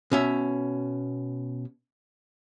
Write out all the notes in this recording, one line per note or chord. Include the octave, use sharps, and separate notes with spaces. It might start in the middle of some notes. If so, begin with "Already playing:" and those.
B2 C#4 E5